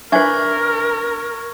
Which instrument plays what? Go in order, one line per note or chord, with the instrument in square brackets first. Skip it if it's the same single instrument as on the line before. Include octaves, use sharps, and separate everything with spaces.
[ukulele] D4 B4 [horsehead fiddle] A#4 [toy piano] E5 G#5 [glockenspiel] C#6 G#6